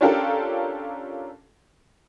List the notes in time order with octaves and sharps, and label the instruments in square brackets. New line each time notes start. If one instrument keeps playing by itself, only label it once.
[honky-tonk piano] C#4 D4 F4 G4 A4 A#4